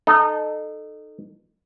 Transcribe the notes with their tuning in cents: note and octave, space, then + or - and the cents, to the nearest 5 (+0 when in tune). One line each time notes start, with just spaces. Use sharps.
D#4 -25 A4 +0